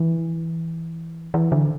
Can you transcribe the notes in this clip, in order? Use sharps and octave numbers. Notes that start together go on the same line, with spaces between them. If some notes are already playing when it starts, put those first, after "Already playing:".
Already playing: E3
E3
D3